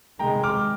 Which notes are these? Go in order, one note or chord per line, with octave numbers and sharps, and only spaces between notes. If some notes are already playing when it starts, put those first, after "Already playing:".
C3 D#3 G#3 G5 A#5
D6 F6